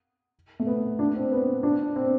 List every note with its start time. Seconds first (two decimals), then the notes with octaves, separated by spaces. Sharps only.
0.60 A3
0.67 B3
0.99 D4
1.16 C4
1.32 B3
1.63 D4
1.96 C4